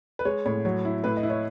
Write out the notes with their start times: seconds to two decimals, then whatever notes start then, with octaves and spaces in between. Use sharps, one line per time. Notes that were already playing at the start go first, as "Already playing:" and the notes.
0.19 B4
0.25 G#3 C#5
0.46 A2 C#5
0.65 F#3 C#5
0.85 E4
1.04 A2 B4
1.17 D#5
1.23 E4
1.30 C#5